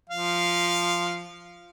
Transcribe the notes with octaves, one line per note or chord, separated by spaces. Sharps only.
F3 F5